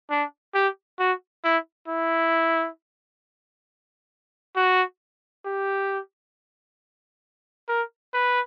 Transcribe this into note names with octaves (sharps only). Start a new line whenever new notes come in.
D4
G4
F#4
E4
E4
F#4
G4
A#4
B4